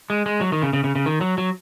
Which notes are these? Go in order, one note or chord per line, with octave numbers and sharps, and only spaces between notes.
G#3
G#3
F#3
D#3
C#3
C#3
C#3
C#3
D#3
F#3
F#3